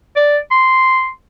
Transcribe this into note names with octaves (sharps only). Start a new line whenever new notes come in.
D5
C6